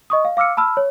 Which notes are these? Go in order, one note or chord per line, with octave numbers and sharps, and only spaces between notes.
D#5 C#6 D#6
F5
F5 D6 E6 F6 C#7
A5 B5 E6 F6
C#5